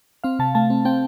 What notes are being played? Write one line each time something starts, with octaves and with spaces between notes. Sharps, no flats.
C4 F5
C3 A5
A3 A5
C4
C4 G5